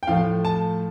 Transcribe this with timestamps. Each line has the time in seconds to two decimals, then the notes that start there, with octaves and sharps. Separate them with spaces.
0.03 G5
0.07 A2 F3 A3 F5
0.45 A5